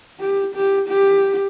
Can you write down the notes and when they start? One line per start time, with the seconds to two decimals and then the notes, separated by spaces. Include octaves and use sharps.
0.20 G4
0.54 G4
0.88 G4